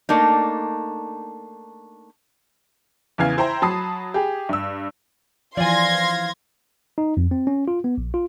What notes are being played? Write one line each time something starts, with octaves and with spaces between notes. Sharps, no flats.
A3 A#3 D4 D#4
E2 C#3 E3 F5 G#6
E4 C5 G5 A#5 C6
F#3 A5 B5 D#6 C7
G4 G#4
G2 E6
E3 F3 D5 F5 G#5 C6 G#6 A#6
D#4
F2
C4
C#4
F4
B3
A#1
F4